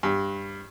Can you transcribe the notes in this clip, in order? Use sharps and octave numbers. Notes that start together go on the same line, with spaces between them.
G2